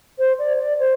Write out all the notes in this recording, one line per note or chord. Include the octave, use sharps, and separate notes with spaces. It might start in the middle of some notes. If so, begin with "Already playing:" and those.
C5
D5
D5
C5